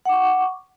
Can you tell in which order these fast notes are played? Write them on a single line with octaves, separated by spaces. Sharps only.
F#5 D6 C#6